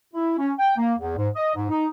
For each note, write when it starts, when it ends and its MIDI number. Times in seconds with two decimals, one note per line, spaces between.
0.14 0.36 64
0.38 0.52 61
0.59 0.75 79
0.78 0.94 58
0.99 1.15 40
1.16 1.29 44
1.36 1.51 75
1.55 1.67 44
1.70 1.86 63